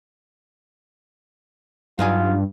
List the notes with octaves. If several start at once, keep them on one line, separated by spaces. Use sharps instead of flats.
G2 F#3 D#4 F4 G#5